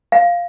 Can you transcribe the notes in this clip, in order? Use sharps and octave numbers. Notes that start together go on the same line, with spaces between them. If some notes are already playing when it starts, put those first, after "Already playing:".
F5